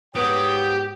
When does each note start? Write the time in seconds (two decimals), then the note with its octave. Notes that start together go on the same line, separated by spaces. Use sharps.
0.15 G#2 F#3 B3 G4 G5 D#6